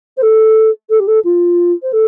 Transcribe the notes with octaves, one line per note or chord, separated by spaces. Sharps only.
C5
A4
A4
G4
A4
F4
C5
A4